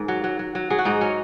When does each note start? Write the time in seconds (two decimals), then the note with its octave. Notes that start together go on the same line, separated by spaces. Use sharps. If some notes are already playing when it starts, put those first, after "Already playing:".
Already playing: G#2 D#3 G#4
0.08 F#3
0.24 F#3
0.39 F#3
0.55 F#3
0.70 F#3 G#4
0.78 F#4
0.85 G#2 D#4
1.01 F#3 C#4